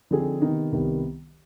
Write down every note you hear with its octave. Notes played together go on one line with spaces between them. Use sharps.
D3 F3 C4 D#4 G#4
C3 D#3 B3 D#4
C2 C3 D#3 G3 B3